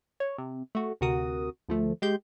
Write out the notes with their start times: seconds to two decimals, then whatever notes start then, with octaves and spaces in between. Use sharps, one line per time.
0.20 C#5
0.38 C3
0.75 A3 F#4
1.01 D2 C3 F#4 A#4 D#6
1.69 D2 F3 A3
2.02 G#3 G4 C6 G6